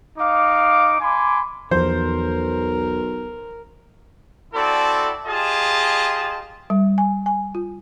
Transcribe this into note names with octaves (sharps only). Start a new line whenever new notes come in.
D#4 F5 D6
G#5 B5 C6 D6
B1 E2 F3 A#4 C5
C4 E4 F#4 A4 D5
F4 G4 G#4 D#5 A5
G3
G#5
G#5
F4